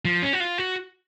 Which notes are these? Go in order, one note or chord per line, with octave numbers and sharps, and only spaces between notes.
F3
C#4
F#4
F4
F#4